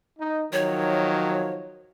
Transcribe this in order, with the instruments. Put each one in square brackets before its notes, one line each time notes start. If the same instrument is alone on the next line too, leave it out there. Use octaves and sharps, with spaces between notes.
[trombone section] D#4
[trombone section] D#3 F3 F#3 [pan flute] C#5